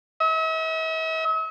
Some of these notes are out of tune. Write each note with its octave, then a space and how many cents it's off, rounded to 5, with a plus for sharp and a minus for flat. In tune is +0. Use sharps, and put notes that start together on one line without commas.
E5 -45